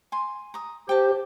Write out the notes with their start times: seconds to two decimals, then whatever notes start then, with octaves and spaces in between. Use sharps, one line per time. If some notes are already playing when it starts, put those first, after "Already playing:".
0.12 G#5 C6
0.54 A#5 D#6
0.89 G4 C5 G5 A5